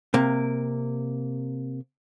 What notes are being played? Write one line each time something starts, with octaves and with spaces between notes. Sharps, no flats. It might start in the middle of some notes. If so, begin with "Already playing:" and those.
C3 A#3